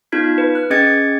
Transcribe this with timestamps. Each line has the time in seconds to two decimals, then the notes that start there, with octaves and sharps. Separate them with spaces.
0.12 B3 D#4 F4 G#6 B6
0.38 B4
0.55 F#6
0.70 C#4 G#4 D#5 G#6 A6 C#7